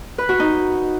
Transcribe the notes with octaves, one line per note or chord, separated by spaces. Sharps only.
B4
F#4
D#4